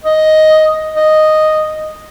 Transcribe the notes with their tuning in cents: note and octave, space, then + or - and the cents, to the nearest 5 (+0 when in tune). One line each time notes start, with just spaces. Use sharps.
D#5 +5
D#5 -5